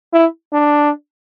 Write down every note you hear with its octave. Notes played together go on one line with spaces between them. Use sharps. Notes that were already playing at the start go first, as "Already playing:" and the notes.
E4
D4